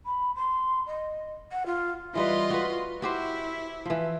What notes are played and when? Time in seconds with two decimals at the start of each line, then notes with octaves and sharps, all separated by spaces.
0.05 B5
0.35 C6
0.86 D#5
1.52 F#5
1.66 F4
2.15 E3 G3 F4 B4 D#5 C6
2.50 F#4 B4
3.02 E4 F#4 G4 C5
3.85 E3 F3